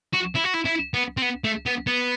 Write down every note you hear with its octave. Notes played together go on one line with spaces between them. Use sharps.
F#4
E4
F#4
E4
E4
B3
C4
B3
A3
B3
B3